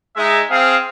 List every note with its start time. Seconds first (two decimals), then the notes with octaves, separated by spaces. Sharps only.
0.16 G#3 D#4 E5
0.49 C4 G#4 F5